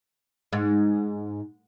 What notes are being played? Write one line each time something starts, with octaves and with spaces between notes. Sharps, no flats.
G#2